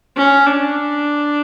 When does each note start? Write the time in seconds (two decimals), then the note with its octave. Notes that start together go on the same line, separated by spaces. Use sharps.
0.17 C#4
0.47 D4